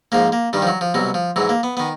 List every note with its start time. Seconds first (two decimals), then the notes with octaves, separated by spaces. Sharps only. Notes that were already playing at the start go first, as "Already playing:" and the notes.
0.12 G#2 F3 A#3
0.32 A#3
0.53 G2 D#3 G3
0.62 F3
0.67 F#3
0.81 F3
0.94 C2 B2 F#3
1.14 F3
1.36 G#2 E3 F#3
1.49 A#3
1.63 B3
1.77 D#3 B3